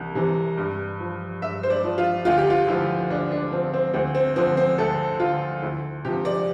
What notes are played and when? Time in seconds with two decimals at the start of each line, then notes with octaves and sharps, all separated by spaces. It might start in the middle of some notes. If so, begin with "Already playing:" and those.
Already playing: C2 E3
0.15 C3 E3
0.57 G2
1.00 F3
1.42 G2 E5
1.63 C5
1.70 D5
1.84 F3
1.98 F4
2.25 D2 F4
2.38 G4
2.50 F4
2.67 D3 F3 E4
3.10 D2 D4
3.32 D4
3.52 D3 F3 C4
3.73 C4
3.94 D2 C4
4.15 C4
4.36 D3 F3 C4
4.57 C4
4.78 D2 A4
5.20 D3 F3 F4
5.62 D2 E4
6.04 C3 G4
6.07 F3
6.25 D5